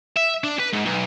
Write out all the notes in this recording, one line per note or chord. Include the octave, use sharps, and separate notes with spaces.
E5
D4
B4
G#2
B1